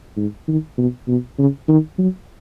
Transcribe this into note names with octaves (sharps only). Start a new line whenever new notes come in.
G#2
D#3
B2
B2
C#3
D#3
F#3